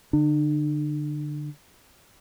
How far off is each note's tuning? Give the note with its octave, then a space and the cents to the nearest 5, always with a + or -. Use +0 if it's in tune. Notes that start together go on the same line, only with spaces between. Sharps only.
D3 +0 D4 +45